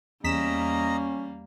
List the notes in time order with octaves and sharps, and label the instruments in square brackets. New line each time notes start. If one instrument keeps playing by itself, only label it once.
[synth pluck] E2 B6 E7 [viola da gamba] G3 A#3 [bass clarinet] C#4 [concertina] D#5 A#5